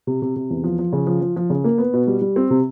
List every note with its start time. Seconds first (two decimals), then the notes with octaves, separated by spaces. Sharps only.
0.07 C3
0.22 C3
0.36 C3
0.51 E2
0.64 F3
0.79 F3
0.93 C#3
1.07 F3
1.21 F3
1.36 F3
1.50 C#3
1.64 A#3
1.78 B3
1.93 B2
2.07 G3
2.22 G3
2.36 C4
2.50 C3